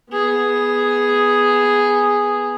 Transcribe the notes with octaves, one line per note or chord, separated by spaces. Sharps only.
B3 G#4